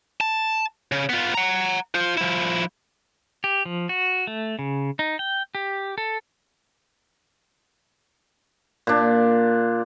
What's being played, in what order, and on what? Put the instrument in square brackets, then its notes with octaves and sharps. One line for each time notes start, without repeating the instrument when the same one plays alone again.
[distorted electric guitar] A5
C#3
B3 F4
F#5 A#5
F4 C5
F3 E4
[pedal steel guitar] G4
F3
F#4
A3
C#3
D#4
G5
G4
A4
[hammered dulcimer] A#2 D4